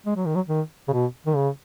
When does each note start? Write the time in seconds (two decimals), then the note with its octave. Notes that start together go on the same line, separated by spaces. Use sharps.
0.06 G#3
0.16 F#3
0.26 D#3
0.36 F#3
0.48 D#3
0.88 C#3
0.93 B2
1.26 D#3
1.36 C#3